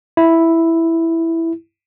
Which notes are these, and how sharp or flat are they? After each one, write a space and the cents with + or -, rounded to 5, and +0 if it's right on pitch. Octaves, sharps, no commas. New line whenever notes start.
E4 +0